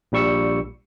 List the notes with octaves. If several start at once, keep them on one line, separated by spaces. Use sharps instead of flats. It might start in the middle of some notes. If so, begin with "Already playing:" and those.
A#1 A#2 G3 C#6 E6 C#7